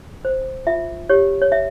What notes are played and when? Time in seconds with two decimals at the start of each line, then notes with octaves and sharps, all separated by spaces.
0.25 C5
0.67 F4 E5
1.09 G4 C#5
1.42 C#5
1.52 C#5 E5